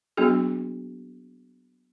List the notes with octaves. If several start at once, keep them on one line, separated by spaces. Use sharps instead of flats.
F#3 A#3 B3 D4 F#4 G#4